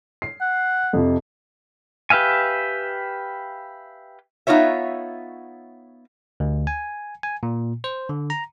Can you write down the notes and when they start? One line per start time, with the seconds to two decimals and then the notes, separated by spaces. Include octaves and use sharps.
0.22 C7
0.41 F#5
0.93 F2 C3 F3
2.10 G4 B4 E5 F5 G#5
4.47 B3 D#4 F4 C#5 E5
6.40 D2
6.67 G#5
7.23 G#5
7.43 A#2
7.84 C5
8.09 D3
8.30 A#5